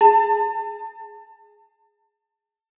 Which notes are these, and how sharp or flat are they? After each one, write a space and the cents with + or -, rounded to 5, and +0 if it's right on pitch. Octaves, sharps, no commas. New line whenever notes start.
G#4 +0 A5 +30